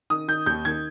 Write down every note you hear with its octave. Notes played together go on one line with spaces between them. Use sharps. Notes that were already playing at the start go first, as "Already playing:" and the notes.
D#3 D#6
D#3 G6
D#2 G6
D#3 G#6